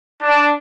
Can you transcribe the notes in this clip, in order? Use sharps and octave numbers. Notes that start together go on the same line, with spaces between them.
D4